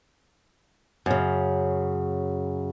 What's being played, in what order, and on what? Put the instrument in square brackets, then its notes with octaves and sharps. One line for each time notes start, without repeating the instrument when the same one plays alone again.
[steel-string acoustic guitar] F#2 C#3